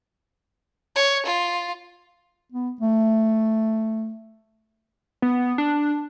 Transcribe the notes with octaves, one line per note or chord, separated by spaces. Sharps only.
C#5
F4
B3
A3
B3
D4